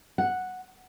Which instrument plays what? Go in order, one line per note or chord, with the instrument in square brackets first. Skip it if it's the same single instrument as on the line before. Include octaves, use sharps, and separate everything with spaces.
[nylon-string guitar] F#5